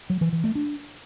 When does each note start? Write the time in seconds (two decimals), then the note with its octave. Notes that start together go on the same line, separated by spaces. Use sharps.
0.10 F#3
0.21 E3
0.32 E3
0.44 A3
0.55 D4